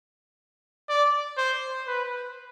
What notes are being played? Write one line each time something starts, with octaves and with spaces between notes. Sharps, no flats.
D5
C5
B4